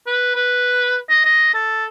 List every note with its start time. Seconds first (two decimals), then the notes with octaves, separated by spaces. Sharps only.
0.07 B4
0.36 B4
1.10 D#5
1.25 D#5
1.54 A4